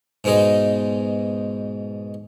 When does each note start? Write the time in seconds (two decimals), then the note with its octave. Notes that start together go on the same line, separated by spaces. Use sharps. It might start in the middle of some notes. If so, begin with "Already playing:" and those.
0.24 G#2 B2 G#3 D#4